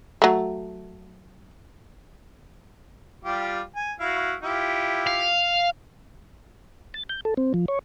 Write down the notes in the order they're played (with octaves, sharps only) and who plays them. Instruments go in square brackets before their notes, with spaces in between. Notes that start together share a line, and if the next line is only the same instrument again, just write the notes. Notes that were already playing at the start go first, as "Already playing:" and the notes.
[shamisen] F#3 A3
[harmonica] G3 F4 G4
G#5
E4 F#4 F5
E4 F4 G4
[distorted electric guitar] F5
[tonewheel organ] A6
G6
A4
C4
F3
C#5